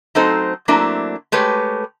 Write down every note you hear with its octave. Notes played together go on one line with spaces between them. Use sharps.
F#3 A3 C4 D#4 A4 C5
F#3 A3 A#3 C4 D4 E4
G#3 A3 G4 B4 C#5